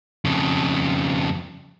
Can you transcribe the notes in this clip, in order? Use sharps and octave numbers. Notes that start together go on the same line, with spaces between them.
F2 C#3